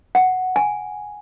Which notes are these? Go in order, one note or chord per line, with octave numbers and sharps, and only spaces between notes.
F#5
G#5